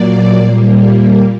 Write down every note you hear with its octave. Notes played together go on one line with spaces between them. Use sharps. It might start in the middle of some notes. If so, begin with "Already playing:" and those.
Already playing: A#2 F#3 A#3 D5
A#2 G3 A#3